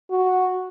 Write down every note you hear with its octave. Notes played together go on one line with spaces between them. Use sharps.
F#4